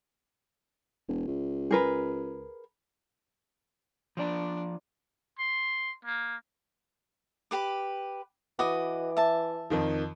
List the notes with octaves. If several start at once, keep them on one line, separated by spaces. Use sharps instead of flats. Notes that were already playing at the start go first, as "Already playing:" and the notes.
E1
C#2
G#4 A#4 B4
F3 D4 D5
C6
A#3
G4 B4 D6
E3 F#4 B4 D#5 D6
E5 A5
F2 D#3 F3